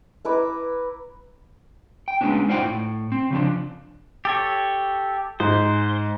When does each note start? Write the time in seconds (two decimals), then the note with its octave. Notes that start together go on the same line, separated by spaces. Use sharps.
0.25 E4 B4 A#5 D6
2.08 G5
2.21 G#3 A#3 B3 C#4 D4
2.48 D#4 F4 C5 D5 F#5 G5
2.63 A2
3.12 C4
3.30 C#3 F3 D4
4.25 G4 A4 C#5
5.40 G#2 C5